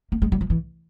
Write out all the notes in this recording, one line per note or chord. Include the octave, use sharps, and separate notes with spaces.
A#3
G#3
G3
F3
E3